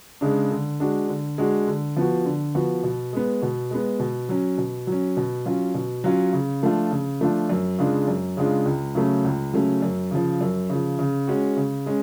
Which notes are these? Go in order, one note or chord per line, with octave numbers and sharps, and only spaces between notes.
C#3 G#3 D4
D3
G#3 D4 F#4
D3
G#3 D4 F#4
D3
F3 B3 F#4
D3
F3 B3 F#4
B2
G#3 B3
B2
G#3 B3
B2
F#3 C#4
B2
F#3
C#4
B2
F#3 C#4 F4
B2
F#3 C#4 F4
C#3
F3 A3 D4 F4
C#3
F3 A3 D4 F4
F#2
C#3 G#3 D4 F4
F#2
C#3 G#3 D4 F4
C#2
C#3 F#3 A3 C#4
C#2
C#3 F#3 A3 C#4
F#2
C#3 F3
F#2
C#3 F3
C#3
G#3 C#4 F#4
C#3
G#3 C#4